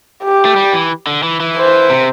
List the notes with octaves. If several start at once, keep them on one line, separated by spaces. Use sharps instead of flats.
G4
A3
G3
E3
D3
E3
E3
C5
C3